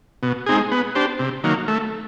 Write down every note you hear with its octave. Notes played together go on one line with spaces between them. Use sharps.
B2
G#3 C4 D#4 G#4
B3
D4 G4 C5
C3
D#3 F#3 A#3
A3